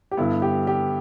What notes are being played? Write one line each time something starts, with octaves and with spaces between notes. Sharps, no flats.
G4
G2 D3 B3 E4
G4
G4